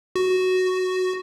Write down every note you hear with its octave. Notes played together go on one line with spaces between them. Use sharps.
F#4